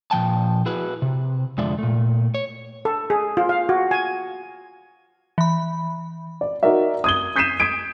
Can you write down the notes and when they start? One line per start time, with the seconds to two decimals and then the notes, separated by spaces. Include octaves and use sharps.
0.11 A#2 F3 G5 A5
0.66 E4 F#4 G#4 B4
1.02 C3
1.58 F2 D3 G#3 F4 D5 E5
1.79 A#2 A3
2.34 C#5
2.85 A4
3.10 G#4
3.37 F4
3.49 F5
3.69 F#4
3.91 G#5
5.38 E3 B5
6.41 D5
6.63 D#4 F#4 A#4 D5 E5
7.04 D#6 G#6 G7
7.36 D#6 G6 B6 C7 D#7 E7
7.60 D#6 G#6 B6 D7